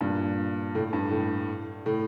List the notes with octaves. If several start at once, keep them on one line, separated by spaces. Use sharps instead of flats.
G2 A#2
A2
G2
A2
A2